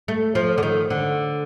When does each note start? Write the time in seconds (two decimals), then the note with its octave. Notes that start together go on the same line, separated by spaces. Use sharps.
0.08 A3
0.35 F3
0.58 D3
0.63 D#3
0.90 D3